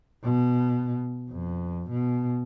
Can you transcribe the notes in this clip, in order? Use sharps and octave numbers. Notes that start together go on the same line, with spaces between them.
B2
F2
B2